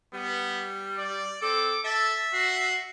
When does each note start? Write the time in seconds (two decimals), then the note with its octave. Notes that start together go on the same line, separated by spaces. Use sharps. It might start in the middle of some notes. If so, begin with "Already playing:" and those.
0.13 G3 B3
0.98 D5
1.42 C4 A4 D6
1.85 A4 E5 A6
2.33 F#4 C7